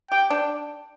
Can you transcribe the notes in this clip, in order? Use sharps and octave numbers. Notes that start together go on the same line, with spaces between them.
G4 G5
D4